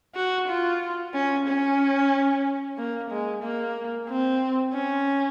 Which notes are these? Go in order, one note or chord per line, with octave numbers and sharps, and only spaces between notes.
F#4
F4
C#4
C#4
A#3
G#3
A#3
C4
C#4